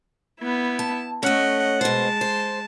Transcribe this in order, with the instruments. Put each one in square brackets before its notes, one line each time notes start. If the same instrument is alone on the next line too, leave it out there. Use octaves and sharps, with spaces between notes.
[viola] B3 E4
[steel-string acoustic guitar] A5
[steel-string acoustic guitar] A3 C#4 [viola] D#5 F#5
[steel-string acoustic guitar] B2 C5 [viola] G#3 A5
[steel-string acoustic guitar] C5